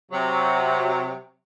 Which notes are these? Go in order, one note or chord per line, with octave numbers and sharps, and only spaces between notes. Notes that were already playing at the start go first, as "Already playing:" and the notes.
C3 F#3